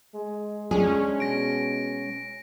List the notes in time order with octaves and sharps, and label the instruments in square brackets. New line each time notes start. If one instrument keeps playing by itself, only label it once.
[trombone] G#3
[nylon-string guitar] G#3 G#4 [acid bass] C#4 [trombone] D4
[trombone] B2 [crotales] A#6 D7